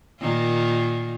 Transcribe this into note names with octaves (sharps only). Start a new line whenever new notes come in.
A#2 D#3 F4